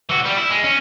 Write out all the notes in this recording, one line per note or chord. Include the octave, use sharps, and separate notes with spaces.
E3 F#4
G3
E4
G#3
C#4